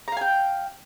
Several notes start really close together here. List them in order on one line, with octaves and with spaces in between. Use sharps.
A#5 F5 G#5 G5